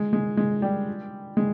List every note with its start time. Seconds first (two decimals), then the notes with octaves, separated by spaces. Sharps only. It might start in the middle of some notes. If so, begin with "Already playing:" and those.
Already playing: G#3
0.13 G#3
0.37 G#3
0.62 G3
1.37 G#3